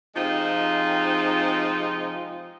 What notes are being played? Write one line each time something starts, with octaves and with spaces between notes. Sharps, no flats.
C3 F3 G#3 C4 D#4 F4